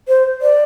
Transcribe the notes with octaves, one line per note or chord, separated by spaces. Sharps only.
C5
D5